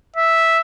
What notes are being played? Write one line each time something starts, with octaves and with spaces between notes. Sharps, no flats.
E5